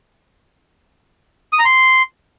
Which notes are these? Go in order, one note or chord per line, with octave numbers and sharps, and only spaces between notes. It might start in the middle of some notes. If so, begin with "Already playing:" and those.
D#6
A#5
C6